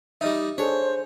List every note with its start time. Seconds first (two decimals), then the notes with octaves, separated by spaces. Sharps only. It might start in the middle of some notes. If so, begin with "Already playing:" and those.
0.21 G3 D#4 D#5 E5
0.58 D4 G#4 A4 C5 C#5